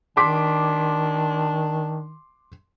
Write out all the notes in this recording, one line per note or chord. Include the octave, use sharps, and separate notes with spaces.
D#3 D4 C6 D6 B6